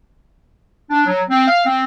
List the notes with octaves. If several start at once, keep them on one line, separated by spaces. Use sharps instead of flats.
D4
F#3
C4
F5
C4